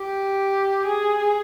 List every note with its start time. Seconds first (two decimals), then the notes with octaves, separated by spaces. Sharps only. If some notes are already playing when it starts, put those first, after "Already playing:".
Already playing: G4
0.86 G#4